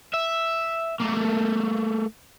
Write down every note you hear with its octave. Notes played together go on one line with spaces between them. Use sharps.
E5
A3 A#3